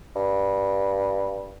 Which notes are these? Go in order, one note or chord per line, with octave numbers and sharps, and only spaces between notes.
G2